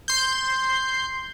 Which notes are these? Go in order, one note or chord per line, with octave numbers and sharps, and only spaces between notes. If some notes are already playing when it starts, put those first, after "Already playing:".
C6 G6